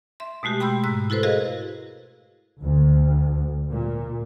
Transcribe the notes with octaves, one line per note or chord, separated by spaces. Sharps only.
E5 C6
B2 G#3 A3 F#4 G4
G5 B5 C6 E6 G6
G#2 A#5 E6 F#6
E4 F#4 A4 B4 C5
F#4 G#4 A#4 D#5 F5
D2
A#2